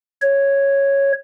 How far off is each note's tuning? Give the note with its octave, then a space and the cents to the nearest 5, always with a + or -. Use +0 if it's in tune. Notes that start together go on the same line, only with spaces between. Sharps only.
C#5 -5